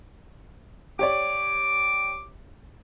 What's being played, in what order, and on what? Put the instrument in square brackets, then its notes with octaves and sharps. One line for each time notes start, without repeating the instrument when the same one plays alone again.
[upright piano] G4 C#5 D5 [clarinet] D6